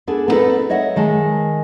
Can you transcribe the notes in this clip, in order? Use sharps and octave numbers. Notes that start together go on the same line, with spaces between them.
B3 D4 G#4 A4
B3 C4 D#4 G#4 A4 B4
C#5 D#5 E5 F#5
D#3 G#3 A5